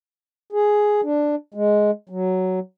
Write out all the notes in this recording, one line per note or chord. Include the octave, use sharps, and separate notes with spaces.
G#4
D4
G#3
F#3